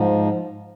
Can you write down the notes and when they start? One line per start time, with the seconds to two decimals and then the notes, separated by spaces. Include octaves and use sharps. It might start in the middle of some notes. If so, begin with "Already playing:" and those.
Already playing: G#2 F3